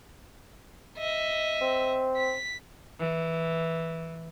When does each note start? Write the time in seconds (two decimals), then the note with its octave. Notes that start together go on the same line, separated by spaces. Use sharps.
0.98 D#5 E5
1.61 C4
2.16 B6
2.99 E3